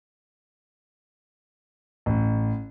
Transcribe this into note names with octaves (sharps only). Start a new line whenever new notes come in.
A1